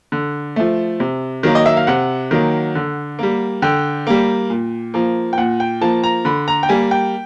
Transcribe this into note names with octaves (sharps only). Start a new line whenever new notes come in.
D3
F3 A3
C3
D#3 F#3 A#3
D#5
E5
F5
C3 F#5
D#3 F#3 A#3
D3
G3 A#3
D3 G5
G3 A#3
A#2
F3 A#3
G5
A#2 F#5
G5
F3 A#3 A5
A#5
D3 B5
A#5
G5
G3 A#3 G#5
G5